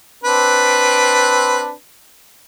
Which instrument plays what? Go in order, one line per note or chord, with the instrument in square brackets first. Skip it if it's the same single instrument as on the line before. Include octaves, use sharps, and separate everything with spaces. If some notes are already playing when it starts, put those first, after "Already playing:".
[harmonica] C4 D4 B4